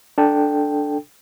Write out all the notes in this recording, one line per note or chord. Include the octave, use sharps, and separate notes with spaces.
D4 A4 G5